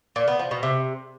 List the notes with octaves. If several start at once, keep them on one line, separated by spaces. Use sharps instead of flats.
A#2
B3
F3
B2
C3